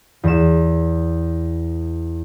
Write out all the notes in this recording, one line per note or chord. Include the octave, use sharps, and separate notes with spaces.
E2 E7